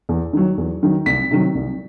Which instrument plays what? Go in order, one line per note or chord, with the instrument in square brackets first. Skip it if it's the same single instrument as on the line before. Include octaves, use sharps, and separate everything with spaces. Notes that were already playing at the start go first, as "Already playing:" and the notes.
[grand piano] E2
D#3 F#3
E2
D#3 F#3
C2 B6
C3 D#3 F#3
C2